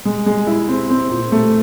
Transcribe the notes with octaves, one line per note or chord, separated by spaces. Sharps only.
G#3
G#3
E4
C4
C4
A#2
A3